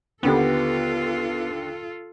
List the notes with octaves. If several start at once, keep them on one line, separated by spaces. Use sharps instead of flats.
D#2 D3 B3 F4 G4 A4